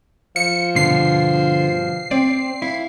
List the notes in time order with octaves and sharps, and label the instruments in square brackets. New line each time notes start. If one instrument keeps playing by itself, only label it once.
[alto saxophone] F3 [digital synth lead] C#7
[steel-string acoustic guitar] G2 B2 [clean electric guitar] D3 [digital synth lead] C7
[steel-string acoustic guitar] C4 [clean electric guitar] D5
[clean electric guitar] E4 [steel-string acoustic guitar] F5